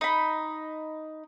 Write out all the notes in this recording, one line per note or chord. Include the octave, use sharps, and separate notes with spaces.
D#4 B5